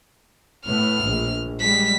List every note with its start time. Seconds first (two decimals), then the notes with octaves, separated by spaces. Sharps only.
0.66 A2 A3 B3 F6
1.04 A#1
1.60 G3 G#3 B6